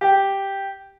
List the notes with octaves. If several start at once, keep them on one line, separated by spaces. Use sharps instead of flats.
G4